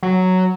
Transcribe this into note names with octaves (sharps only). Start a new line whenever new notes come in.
F#3